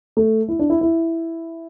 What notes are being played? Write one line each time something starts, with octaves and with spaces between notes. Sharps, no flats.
A3
E4
D4
E4
E4